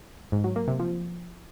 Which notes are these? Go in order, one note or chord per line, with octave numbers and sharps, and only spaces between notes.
G#2
F#3
A#3
C3
F3